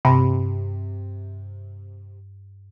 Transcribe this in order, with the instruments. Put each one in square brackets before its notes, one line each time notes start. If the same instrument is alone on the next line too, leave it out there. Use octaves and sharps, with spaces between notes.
[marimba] G2 [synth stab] C3